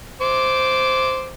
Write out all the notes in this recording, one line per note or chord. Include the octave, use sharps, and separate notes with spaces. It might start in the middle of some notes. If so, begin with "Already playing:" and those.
C5 D6